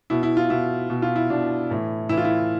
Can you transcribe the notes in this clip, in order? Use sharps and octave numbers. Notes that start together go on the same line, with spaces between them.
B2 E4
E4
F4
B2 E4
B2
F4
E4
B2 D4
A2 E3
A2 E3 E4
F4
E4